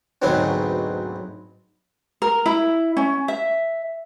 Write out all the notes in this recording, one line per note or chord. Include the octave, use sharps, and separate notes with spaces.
D2 G#2 B2 F#3 B3 C4
A#4
E4
C#4
E5